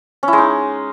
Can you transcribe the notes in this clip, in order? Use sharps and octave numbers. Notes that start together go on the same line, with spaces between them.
C#4
E4
G#3
D#4